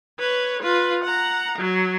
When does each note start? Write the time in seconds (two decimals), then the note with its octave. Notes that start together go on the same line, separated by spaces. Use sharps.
0.19 B4 C#5
0.62 F4 B4
1.04 F#5 A#5
1.59 F#3